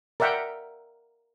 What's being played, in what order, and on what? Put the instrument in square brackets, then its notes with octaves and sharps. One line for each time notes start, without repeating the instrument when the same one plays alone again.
[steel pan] A#4 D5 E5 F#5 G5